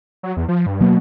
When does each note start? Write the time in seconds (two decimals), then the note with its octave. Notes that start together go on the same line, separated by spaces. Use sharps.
0.23 F#3
0.37 E2
0.49 F3
0.66 G2
0.81 B2 F#3 A#3